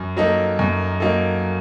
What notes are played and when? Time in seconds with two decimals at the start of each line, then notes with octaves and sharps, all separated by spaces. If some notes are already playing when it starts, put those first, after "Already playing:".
Already playing: F#2
0.17 F#3 A#3 D#4 A4
0.59 F#2
1.00 F#3 A#3 D#4 A4